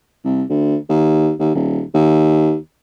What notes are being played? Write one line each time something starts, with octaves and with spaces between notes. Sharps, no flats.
C2
D2
D#2
D#2
D#1
D#2